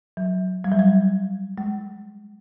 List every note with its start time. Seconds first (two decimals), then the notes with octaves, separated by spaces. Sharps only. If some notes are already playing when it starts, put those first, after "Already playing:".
0.17 F#3
0.64 G3
0.72 F#3
0.79 G3
1.58 G#3